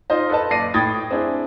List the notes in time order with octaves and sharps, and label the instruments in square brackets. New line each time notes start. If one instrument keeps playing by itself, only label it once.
[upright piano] D#4 F4 C5 D#5
A4 B4 D#5 A5
F#1 D5 A#6 C7 D#7
A2 G5 B5 D#6 G#6 A6
C4 D4 E4 G#4